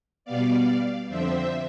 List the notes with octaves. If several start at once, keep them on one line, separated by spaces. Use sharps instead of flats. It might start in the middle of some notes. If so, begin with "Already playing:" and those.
B2 G3 B3 D5 F5
F2 D3 F3 C4 C5 E5